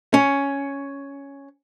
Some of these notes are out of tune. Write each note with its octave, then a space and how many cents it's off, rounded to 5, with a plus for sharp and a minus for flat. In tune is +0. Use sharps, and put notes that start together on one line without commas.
C#4 +5